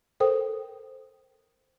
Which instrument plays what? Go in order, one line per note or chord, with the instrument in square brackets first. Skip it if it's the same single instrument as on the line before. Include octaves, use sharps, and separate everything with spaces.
[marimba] A4 A#4 C5 G5 D#6